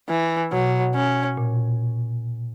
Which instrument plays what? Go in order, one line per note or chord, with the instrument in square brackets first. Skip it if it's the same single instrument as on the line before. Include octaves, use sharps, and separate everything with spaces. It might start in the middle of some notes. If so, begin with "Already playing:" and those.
[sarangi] E3
[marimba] B2 [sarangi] F#3
[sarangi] C#4
[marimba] A#2